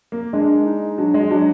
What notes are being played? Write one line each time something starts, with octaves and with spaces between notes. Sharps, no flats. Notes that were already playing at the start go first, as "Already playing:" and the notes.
A#3
G#3 D4
D#4
F#3 D4
G#3
F#3 D4